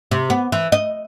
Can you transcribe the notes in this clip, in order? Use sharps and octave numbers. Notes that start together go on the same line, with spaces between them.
C3
B3
E3
D#5